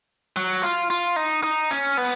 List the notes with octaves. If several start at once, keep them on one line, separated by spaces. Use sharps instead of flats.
F#3
F4
F4
D#4
D#4
C#4
B3